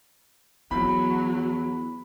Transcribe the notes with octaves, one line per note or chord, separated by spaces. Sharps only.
E2 F#3 B3 B5